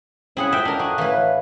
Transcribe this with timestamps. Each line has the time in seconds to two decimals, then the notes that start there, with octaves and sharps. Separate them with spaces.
0.37 C#3 C4 E4 G#4 F#5
0.53 F2 E5 G5
0.65 D4 A#4
0.79 F#4 G#4
0.98 A2 E3 B4 F5